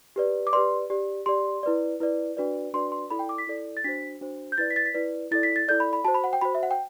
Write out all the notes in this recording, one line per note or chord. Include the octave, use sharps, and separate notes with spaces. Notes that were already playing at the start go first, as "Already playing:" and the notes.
G4 B4 D5
D6
G4 B4 D5 C6
G4 D5
G4 D5 C6
E4 B4 D5
E4 B4 D5
D4 F#4 B4 D5
D4 F#4 B4 D5 C6
C6
E4 A4 D5 B5
G5
D6
B6
E4 A4 D5
A6
D4 F#4 C5 B6
D4 F#4 C5
G6
E4 B4 D5 A6
B6
A6
B6
E4 B4 D5
E4 A4 D5 A6
B6
A6
E4 A4 D5 G6
B5
B5
F#4 C5 A5
B5
F#5
G5
F#4 C5 B5
E5
F#5
G5